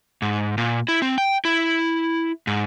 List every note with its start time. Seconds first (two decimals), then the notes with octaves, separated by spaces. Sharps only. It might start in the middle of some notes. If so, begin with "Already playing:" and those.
0.22 G#2
0.58 A#2
0.88 E4
1.02 C4
1.18 G5
1.45 E4
2.47 G#2